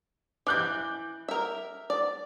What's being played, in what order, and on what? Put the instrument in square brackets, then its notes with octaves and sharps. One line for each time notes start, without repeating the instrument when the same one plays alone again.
[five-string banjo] E3 [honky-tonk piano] D6 F#6 G6
[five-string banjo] A#4 E5
D5